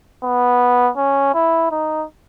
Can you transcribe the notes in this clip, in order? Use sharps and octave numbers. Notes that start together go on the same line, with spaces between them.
B3
C#4
E4
D#4